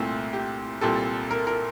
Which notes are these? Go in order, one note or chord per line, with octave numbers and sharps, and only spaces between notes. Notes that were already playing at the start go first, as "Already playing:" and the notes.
Already playing: C2 A#2 A3 C4
G4
C2 A#2 G3 C4 A4
A#4
A#4